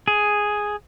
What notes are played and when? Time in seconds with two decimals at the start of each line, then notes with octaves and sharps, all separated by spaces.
0.08 G#4